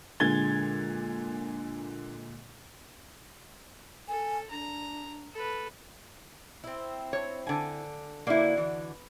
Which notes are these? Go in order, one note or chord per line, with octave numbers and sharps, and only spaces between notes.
A#2 D3 G#3 G#6 A6 G7
A4 G#5
D4 A#5
A4 B4
C4 E4
C#5
D3 G#5
D3 A#3 E4 F#4
E3